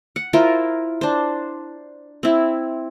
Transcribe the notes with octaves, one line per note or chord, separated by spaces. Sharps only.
F#5
E4 F4 A#4 C5
D4 C5
C4 E4